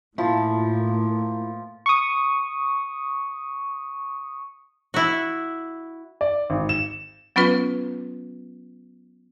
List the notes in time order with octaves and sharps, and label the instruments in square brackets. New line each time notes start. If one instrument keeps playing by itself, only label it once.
[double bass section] A2 [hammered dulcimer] F3 [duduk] A#3 [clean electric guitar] E4 F4
[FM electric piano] C#6 D#6
[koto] E4 F#4
[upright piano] D5
G#1
E7
[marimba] F#3 B3 C#4 F4 B4